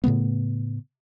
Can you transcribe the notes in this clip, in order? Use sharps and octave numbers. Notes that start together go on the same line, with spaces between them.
A2 C#3 A3 B3